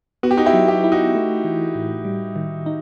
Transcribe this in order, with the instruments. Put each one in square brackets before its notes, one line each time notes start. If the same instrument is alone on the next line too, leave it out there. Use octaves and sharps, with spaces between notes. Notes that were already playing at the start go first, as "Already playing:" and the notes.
[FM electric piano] B3 [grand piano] F#4
[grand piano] G4
D#4 F#4
E4 G4
[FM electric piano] F#3
[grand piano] E4 G4
[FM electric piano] E4
[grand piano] D#4 F#4
[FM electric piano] A3
E3
A2
G3
D#3
D#4